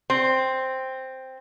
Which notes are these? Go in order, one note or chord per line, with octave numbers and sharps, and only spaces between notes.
C4